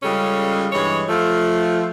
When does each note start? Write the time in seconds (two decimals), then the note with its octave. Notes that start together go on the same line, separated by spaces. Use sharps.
0.03 C#3 G3 G#3 C#4 F4 A4
0.73 G2 E3 G#3 C#5
1.09 F3 A3 F4